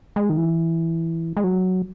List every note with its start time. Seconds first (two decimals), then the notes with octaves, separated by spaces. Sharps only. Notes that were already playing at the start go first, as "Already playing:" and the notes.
0.16 G#3
0.29 D#3
0.37 E3
1.37 G#3
1.44 F#3